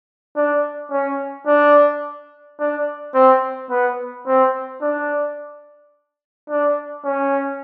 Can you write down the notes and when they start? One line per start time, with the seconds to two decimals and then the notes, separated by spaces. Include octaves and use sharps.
0.36 D4
0.91 C#4
1.47 D4
2.60 D4
3.15 C4
3.70 B3
4.27 C4
4.82 D4
6.50 D4
7.05 C#4